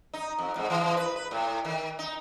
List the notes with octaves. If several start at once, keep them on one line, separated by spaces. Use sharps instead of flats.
D#4
F2
G#2
E3
E3
B4
B4
A2
D#3
D#4